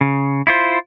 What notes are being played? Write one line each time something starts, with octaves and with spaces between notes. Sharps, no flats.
C#3
E4 F4 C5